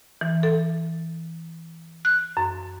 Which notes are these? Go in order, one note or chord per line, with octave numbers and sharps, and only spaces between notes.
E3
A4
F#6
F#2